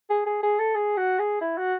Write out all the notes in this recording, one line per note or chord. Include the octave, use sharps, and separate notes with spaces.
G#4
G#4
G#4
A4
G#4
F#4
G#4
E4
F#4